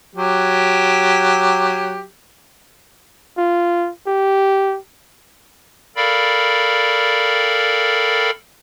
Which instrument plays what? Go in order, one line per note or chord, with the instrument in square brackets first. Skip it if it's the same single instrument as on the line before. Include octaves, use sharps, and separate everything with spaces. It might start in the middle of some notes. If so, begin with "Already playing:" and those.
[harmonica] F#3 G4
[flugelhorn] F4
G4
[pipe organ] A4 A#4 D5 F5 G5 B5